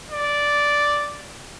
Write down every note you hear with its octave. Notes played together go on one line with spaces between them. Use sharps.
D5